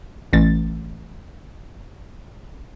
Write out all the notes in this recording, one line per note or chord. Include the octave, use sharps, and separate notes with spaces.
A1 A6